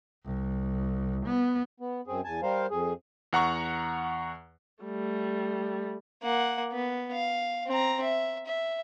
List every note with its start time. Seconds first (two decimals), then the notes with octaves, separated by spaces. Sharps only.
0.25 C2
1.26 B3
1.80 B3
2.07 F#2 C4 G#4
2.24 E2 G#5 A5
2.42 G3 A#4 C5 F5
2.71 F2 G#4
3.33 E2 F#5 A#5 C#6
4.83 G3 A3
6.23 A#3 F#5
6.72 B3
7.13 F5
7.67 C4 A#5
8.02 E5
8.47 E5